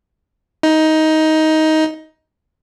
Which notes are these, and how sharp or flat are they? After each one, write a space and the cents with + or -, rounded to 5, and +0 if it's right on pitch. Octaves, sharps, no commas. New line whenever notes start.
D#4 +15